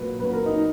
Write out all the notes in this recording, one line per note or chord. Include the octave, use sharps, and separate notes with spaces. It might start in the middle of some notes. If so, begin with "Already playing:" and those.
Already playing: A#2 F#3 B4
A#2 F#3 B4
A#4
D#4